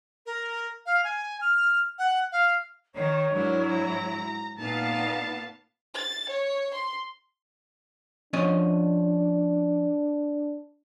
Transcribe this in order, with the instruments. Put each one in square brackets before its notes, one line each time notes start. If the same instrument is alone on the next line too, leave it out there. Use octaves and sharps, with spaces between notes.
[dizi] A#4
F5
G#5
F6
F#5
F5
[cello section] D#3 [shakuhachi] C#5
[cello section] G#2 F#3 E4 [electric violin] D4 A#4
[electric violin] A#5
[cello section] A#2 B3 F5 [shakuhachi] D#4 [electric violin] A5
[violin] A6
C#5
C6
[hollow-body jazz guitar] F3 C#4 D#5 [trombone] D4